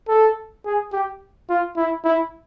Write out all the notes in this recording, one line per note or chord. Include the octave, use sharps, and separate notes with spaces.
A4
G#4
G4
F4
E4
E4